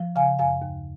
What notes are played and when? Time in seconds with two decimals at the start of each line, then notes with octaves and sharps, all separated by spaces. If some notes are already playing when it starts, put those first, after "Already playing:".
Already playing: F3
0.16 C#3 F5 G#5
0.39 F#2 F5 G#5
0.62 D#2